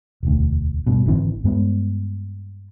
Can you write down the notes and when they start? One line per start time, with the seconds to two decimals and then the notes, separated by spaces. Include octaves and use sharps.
0.23 E1 D2
0.87 G2 B2
1.06 G#1 D3 E3 C4
1.44 G2 G#3 B3